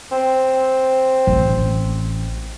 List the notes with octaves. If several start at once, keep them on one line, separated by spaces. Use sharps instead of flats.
C4
A1